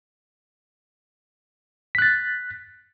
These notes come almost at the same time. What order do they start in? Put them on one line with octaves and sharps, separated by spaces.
B6 F#6 A6